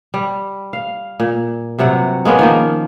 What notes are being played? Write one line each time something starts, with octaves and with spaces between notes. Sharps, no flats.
G3
F5
A#2
G2 C3 F#3 F#5
G#3 A#3 B3 C#4
D#3 F3 A#3